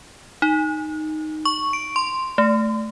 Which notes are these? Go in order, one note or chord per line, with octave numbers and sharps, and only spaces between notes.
D#4
C#6
D7
C6
A3